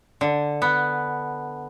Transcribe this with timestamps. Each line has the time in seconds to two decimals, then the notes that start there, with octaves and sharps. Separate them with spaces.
0.21 D3
0.62 B3